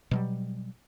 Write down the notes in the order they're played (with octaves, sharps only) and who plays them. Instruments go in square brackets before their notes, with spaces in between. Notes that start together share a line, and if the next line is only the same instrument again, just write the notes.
[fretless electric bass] B2 F#3 G3